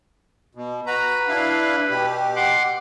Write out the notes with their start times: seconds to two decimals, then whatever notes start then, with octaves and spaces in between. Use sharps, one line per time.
0.55 B2
0.86 F#4 B4 A#5
1.28 D4 E4 F5
1.89 B2 G4
2.36 F#5 C6 D6